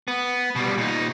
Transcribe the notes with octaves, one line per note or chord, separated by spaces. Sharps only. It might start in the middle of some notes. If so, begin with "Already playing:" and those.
B3
B2 G3
A#2 D#4